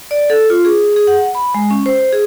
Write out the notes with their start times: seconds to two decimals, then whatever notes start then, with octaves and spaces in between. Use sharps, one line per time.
0.11 D5
0.30 A4
0.50 F4
0.65 G#4
0.96 G#4
1.07 F#5
1.35 B5
1.54 G#3
1.71 C#4
1.86 C5
2.13 G#4